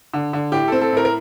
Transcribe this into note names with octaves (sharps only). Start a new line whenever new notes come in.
D3
D3
A2 G4
C4 A4
A4
A2 A#4
A#4